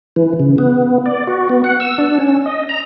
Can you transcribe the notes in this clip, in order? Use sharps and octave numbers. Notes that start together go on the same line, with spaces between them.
E3
C#3
B3
D5
F#4
B3
F#5
E6
D4
C#4
D#5
A#5